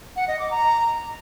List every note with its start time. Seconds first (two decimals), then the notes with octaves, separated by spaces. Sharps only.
0.16 F#5
0.28 D#5
0.39 D6
0.51 A#5